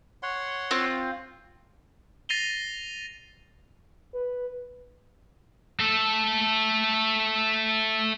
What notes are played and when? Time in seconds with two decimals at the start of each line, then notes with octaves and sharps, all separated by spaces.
0.23 C#5 F#5 C6
0.71 C4 F4
2.29 A6 A#6 C7 D#7 F7 G7
4.14 B4
5.80 A3 A4